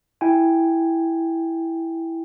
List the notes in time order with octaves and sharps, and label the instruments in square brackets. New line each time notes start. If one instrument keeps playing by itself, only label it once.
[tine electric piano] E4 G5 G#5